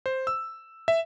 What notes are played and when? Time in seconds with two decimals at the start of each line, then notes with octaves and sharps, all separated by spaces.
0.06 C5
0.27 E6
0.88 E5